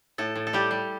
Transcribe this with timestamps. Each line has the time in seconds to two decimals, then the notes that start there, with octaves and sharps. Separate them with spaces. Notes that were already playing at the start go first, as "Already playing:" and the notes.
0.18 A2 A4
0.36 A2
0.47 A4
0.53 G3 G4
0.71 G3